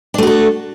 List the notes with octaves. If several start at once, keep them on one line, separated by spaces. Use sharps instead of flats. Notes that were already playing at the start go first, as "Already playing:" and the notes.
A3 D4 F#4 A4